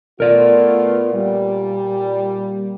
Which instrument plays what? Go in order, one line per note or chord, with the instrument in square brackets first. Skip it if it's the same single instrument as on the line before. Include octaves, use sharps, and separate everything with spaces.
[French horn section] A3 B3 F4 [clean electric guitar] A#4 D5
[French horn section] A#2 G3